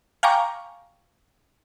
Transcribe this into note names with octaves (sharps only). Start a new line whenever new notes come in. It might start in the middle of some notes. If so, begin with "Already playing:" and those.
F5 G5 G#5 A#5 C#6 D6